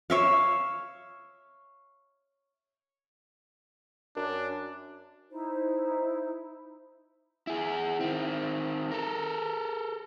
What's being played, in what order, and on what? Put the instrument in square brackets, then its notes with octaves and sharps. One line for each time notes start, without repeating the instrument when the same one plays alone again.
[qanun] C#5 E5 F5
[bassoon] F#2 [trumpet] D4
[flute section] D#4 E4 C5
[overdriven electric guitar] E4 G#4
D#3 C4
A4 A#4